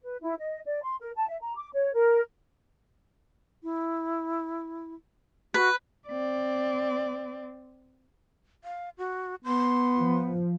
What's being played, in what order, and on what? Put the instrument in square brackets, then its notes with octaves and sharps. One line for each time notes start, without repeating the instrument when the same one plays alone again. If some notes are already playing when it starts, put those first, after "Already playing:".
[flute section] B4
E4
D#5
D5
C6
A#4
A5
E5
A#5
D6
C#5
A#4
[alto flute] E4
[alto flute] F#4 [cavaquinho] B4
[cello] C4 D5
[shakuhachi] F5
F#4
[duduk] B3 [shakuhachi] C6
[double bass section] F3